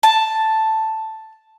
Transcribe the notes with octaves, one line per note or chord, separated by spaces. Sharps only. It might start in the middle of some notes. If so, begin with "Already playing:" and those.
A5